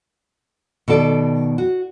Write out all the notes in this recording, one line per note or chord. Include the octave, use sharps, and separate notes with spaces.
B2 D#3 A4 D5
F#4